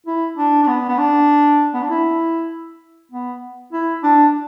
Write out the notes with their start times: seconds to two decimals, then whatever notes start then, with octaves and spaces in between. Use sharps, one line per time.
0.06 E4
0.37 D4
0.63 D4
0.68 B3
0.89 B3
0.98 D4
1.74 B3
1.82 D4
1.90 E4
3.12 B3
3.73 E4
4.03 D4